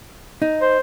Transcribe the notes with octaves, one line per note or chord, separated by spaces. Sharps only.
D#4
C5